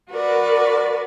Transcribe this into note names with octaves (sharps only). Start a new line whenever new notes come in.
F#4 A#4 B4 D5